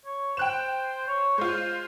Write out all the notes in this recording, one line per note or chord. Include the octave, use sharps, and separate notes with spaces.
C#5
C5 G5 F#6 E7
C#5
G#3 F4 C5